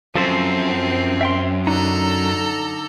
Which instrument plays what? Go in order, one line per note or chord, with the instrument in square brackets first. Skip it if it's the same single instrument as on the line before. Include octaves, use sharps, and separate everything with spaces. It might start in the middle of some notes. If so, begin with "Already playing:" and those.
[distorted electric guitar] F#2 [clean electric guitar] F3 A4 C5 [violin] C4
[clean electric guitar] E5 G5 C6
[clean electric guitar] D3 D#4 [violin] A4 A#5